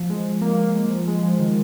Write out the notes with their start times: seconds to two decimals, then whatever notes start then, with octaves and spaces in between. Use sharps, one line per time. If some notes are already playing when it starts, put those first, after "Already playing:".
Already playing: F3
0.10 G#3
0.42 A#3
0.58 A#3
0.75 G#3
0.90 F3
1.07 G#3
1.23 F3
1.39 D#3